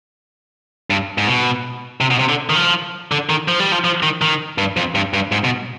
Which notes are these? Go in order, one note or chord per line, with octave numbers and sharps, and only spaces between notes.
G2
G#2
B2
C3
B2
C3
D3
D#3
F3
D3
D#3
F3
G3
F3
F3
D#3
D#3
G2
F2
G2
G2
G#2
B2